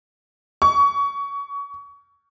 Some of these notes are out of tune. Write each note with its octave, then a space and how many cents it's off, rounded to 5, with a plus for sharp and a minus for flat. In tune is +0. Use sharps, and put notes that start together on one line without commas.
C#6 +25